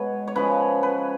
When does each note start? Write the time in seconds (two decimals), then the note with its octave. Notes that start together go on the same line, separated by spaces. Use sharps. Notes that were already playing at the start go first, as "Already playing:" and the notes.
Already playing: B2 G#3 B4 C#5
0.28 C#5
0.35 C#3 F3 G#3 B4
0.83 B4